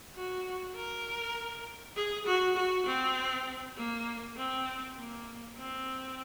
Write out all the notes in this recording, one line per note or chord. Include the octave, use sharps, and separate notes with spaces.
F#4
A#4
G#4
F#4
F#4
C4
A#3
C4
A#3
C4